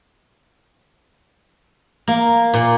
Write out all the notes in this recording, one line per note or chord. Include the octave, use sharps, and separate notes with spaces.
A#3
A#2